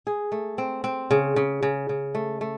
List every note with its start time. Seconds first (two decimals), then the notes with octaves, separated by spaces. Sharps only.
0.07 G#4
0.32 A3
0.58 C4
0.84 C4
1.11 C#3
1.36 C#3
1.63 C#3
1.89 C#3
2.15 A3
2.41 A3